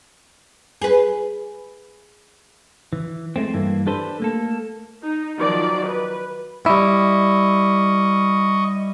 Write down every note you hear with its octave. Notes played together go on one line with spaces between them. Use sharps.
G#4 B4
E3
G#3 A3 C4
G2 E3 A#3
D4 G4 A4 B4 C5
A3 A#3 A4
D#4
D#3 F3 F#3 D5
B4
G3 E4 D#5 C#6